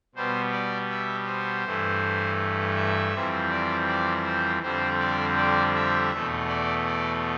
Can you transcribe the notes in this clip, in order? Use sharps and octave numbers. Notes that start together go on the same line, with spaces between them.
B2 G3 B3 C5
D5
E5
C5
G2 E3 A3
E5
F2 E3 G3 C4
D5
D5
C5
F2 D3 G3 C4 C5
D5
D5
E5
E2 B2 A3
D5
D5